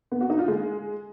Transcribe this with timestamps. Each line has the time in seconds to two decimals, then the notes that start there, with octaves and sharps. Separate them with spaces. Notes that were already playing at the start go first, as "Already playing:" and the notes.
0.12 B3
0.21 F#4
0.30 D#4
0.39 F4
0.48 G#3